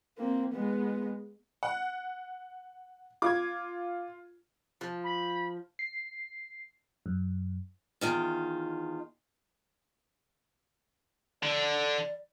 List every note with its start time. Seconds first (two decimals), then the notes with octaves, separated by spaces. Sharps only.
0.17 A#3 C4
0.53 G#3 B3
1.63 F#5
3.22 F4 D6 G#6
4.81 F3
5.04 B5
5.79 C7
7.06 F#2
8.01 E2 D#3 F4
11.43 D3 D5